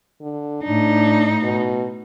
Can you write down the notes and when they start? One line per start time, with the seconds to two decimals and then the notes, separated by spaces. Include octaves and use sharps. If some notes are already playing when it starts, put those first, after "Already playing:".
0.21 D3
0.64 A2 D4 D#4
1.43 B2